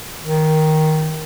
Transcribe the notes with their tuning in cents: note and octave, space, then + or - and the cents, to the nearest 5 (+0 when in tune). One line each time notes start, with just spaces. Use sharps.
D#3 +5